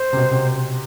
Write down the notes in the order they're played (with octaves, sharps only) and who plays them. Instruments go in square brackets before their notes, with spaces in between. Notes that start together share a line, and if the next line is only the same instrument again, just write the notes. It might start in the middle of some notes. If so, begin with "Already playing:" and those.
Already playing: [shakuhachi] C5
[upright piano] C3
B2
C3